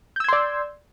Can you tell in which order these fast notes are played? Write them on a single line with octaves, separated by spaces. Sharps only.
G6 E6 G#6 C6 D5